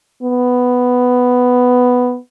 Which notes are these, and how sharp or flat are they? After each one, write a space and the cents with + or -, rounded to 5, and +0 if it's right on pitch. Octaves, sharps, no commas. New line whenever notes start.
B3 +5